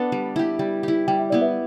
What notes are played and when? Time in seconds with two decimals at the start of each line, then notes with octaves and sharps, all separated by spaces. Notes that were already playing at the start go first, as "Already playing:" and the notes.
Already playing: B3 D4 A4 B4
0.12 G3
0.36 E4 G4
0.59 G3
0.83 E4 G4
1.08 G3 G5
1.19 E5
1.30 B3 E4 D5
1.41 B4 E5